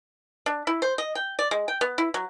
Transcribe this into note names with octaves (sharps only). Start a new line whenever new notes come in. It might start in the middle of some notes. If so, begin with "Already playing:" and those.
D4
E4
C5
D#5
G5
D5
G#3
G5
B3
E4
F#3